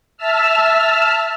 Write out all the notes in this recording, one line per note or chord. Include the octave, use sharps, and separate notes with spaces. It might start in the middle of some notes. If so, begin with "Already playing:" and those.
E5 A5 E6 F6